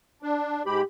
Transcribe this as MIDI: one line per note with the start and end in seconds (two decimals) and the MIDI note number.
0.23 0.63 62
0.66 0.82 44
0.66 0.82 56
0.66 0.82 67
0.66 0.82 83